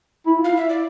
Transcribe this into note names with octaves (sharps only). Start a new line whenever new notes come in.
E4
F4
F5
E4
E5
D5